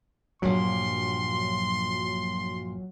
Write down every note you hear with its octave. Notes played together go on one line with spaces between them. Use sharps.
A#1 G2 A#2 F#3 C6